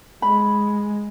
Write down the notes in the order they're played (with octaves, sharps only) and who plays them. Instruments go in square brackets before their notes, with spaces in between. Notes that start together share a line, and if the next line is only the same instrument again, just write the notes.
[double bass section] G#3 [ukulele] B5